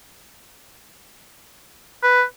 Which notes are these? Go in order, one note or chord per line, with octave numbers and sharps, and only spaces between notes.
B4